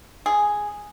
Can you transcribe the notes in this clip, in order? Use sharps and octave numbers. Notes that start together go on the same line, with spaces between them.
G#4